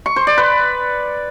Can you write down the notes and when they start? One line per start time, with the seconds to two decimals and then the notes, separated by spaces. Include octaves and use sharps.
0.06 C#6
0.16 C5
0.27 D5
0.38 B4